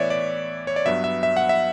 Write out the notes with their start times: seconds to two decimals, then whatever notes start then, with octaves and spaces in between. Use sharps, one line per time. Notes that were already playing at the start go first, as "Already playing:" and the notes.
Already playing: A2 E3 B3 C#5 D5 E5
0.10 D5
0.67 C#5
0.76 D5
0.86 G2 F#3 B3 E5
1.04 E5
1.23 E5
1.37 F#5
1.49 E5